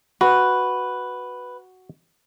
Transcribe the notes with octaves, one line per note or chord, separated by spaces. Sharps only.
F#4 B4